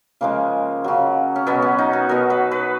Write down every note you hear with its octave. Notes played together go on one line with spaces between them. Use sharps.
C#3 F3 G#3 A#3
C#3 F#3
C#4
B2 F#3 B3
C#4
D#4
F#4
B2 F#3 A#4
B4
B4